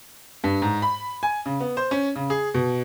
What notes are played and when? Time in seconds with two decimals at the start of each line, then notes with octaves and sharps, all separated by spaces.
0.44 G2
0.62 G#2
0.82 B5
1.23 G#5
1.46 C#3
1.60 B3
1.77 C5
1.91 C#4
2.16 C#3
2.30 G#4
2.54 B2